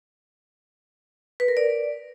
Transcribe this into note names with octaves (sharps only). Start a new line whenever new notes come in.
B4
A#4
D5